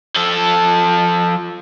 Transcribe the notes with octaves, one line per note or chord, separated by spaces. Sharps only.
F3 A4